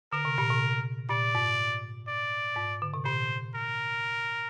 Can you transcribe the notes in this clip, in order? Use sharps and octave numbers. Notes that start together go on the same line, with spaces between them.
D3 A#4
C3
A#2
C3
A#2 D5
G#2
D5
G#2
D3
C3
A#2 C5
A#4